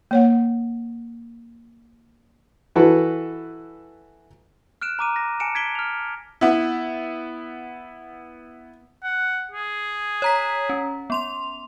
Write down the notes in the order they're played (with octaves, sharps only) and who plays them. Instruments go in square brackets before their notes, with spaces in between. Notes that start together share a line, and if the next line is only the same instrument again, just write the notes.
[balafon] A#3 C#5 F#5
[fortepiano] E3 E4 F#4 A4 B4
[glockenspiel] F6 F#6 D7 E7
A#5 D6 D#7
A#6
G#5 A5 C#7 D7 E7
G#6 B6 D7 G7
F6 F7
[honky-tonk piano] B3 E4
[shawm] F#5
G#4
[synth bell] C#5 A#5 B6
C#4
B3 C6 F7